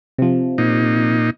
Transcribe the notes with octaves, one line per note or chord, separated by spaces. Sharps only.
C3 F3
A#2 D#4